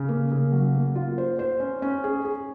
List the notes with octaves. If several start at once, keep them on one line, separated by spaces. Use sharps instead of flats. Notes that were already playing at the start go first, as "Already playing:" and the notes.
Already playing: C#3
A#3
C#3
F#3
A#3
F4
C5
C5
C#4
C#4
G#4
G#4